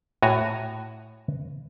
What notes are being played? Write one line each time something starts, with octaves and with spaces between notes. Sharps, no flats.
A2 F#4 G#5 A#5